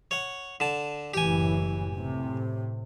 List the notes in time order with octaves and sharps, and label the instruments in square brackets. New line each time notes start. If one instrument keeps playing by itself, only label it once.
[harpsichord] C#5 F#5
D3 A5
[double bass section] F#1 A2 E3 [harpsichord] G4 G#5
[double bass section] A2 C3